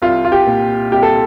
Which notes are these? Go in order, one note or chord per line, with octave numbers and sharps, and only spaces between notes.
C2 F4
F4
G4
A#2
C2 G4
A4